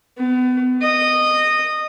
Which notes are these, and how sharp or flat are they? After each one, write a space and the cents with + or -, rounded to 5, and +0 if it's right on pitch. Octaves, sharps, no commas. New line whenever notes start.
B3 +35
D#5 -15